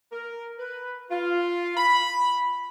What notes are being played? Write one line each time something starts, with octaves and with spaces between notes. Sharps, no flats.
A#4
B4
F4
B5